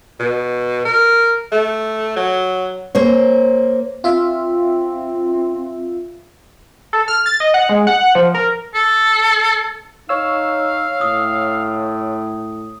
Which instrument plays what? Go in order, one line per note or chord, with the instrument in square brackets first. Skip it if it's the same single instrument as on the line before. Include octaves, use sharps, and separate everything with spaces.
[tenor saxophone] B2
A#4
A3
F#3
[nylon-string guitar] A#3 C5 C#5
[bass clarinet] C4 [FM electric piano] F4 E5
[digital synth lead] A4
F6
A6
D#5
F#5
G#3
F#5
F3
A#4
[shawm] A4
[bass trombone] D#4 [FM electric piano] C#5 E6 [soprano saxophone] F5
[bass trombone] A2 [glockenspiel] D#6